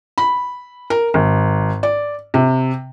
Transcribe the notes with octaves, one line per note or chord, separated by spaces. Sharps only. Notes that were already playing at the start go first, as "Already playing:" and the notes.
B5
A#4
G#1
D5
C3